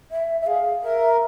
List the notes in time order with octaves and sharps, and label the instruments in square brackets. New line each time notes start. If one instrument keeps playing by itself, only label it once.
[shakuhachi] E5
E5
[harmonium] G#4 [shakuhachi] F5
[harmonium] A#4 [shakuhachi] E5